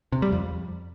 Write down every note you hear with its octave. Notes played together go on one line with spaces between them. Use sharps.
C3
G3
F2